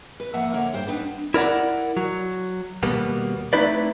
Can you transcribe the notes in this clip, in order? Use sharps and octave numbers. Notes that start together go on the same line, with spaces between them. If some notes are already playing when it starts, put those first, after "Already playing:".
B4
F2 A#3 E5 F#5 A5
D3 A#3 A#4 C#5 E5
G2 C5 F5 G5
B3 C4 D4 D#4 B4
E4 A#4 D5 F#5
F#3
D#2 B2 G3 A#3 B3
A3 C4 D#4 E4 B4 D5